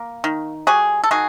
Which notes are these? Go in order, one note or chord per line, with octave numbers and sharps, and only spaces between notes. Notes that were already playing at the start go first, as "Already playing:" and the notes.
Already playing: A#3
D#3
G3 F#4 G#4
A4
D#3 F#4 G#4